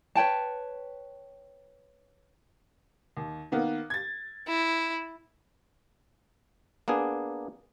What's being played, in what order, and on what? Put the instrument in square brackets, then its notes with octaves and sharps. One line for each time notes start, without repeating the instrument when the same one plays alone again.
[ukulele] B4 C#5 G5 A5
[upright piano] D#2
D#3 A#3 B3
G#6 A6
[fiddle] E4
[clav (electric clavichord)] A#3 B3 D4 G#4